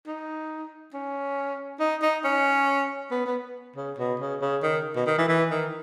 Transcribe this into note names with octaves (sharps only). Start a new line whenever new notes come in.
D#4
C#4
D#4
D#4
C#4
B3
B3
C#3
B2
C#3
C#3
D#3
B2
D#3
E3
E3
D#3